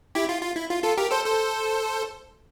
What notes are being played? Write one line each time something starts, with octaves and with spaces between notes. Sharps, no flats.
E4 G4
F4
F4
E4
F4
F4 A4
G4 A#4
A4 C5
A4 C5